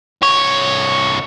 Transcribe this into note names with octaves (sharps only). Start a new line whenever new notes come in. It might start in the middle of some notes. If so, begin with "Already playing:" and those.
C2 C#5